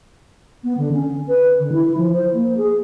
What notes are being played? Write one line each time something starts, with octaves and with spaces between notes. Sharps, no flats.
B3
D3
C#4
B4
D3
E4
F3
C5
A#3
G#4